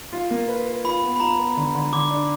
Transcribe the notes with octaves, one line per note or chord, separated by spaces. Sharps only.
F4
A#3
B4
B4
F4 B5
B3
B5
F4 A#5
B3
D3
D3
D3 D6
D4